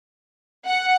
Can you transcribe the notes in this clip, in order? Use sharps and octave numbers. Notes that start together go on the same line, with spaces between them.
F#5